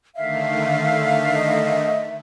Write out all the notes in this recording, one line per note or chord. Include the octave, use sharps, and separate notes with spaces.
D3 D#3 A3 E5 F5
D#5